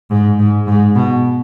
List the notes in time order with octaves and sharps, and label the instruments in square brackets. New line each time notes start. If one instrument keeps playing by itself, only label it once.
[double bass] G#2
G#2
G#2
B2